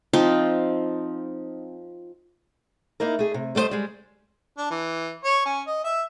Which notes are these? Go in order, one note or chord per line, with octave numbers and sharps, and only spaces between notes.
F3 C4 D#4 F4
A#3 D#4 E4 A#4
A3 G#4
C3
G3 A3 B3 C5 D#5
G3 G#3
D4
E3
C#5
C#4
D#5
E5